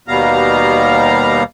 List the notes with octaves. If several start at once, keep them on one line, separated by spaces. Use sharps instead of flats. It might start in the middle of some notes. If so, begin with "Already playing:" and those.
D#2 B2 G3 B3 F5 A#5